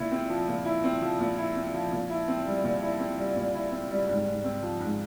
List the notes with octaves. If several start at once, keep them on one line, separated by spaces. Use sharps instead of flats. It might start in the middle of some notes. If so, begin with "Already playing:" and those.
Already playing: A#2 E4
C4
F3
A#2
E4
C4
F3
A#2
E4
C4
F3
A#2
E4
C4
G3
A#2
E4
C4
G3
A#2
E4
C4
G3
G#2
G#2
C4
F3
G#2